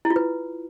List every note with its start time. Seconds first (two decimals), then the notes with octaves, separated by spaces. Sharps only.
0.05 E4
0.10 F4
0.16 B4